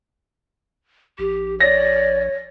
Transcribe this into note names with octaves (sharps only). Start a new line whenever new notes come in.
A#1 G4
C#5 D5 A#6